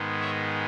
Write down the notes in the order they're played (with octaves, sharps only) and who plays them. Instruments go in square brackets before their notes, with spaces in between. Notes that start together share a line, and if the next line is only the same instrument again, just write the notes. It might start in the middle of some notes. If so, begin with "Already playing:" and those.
Already playing: [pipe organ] G#2 D#3 G#3 B3
C#5 E5